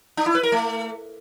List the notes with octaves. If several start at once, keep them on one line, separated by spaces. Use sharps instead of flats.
D4
E4
B4
A#4
A3